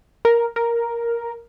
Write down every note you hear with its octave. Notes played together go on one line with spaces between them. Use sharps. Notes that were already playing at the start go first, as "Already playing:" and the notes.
A#4
A#4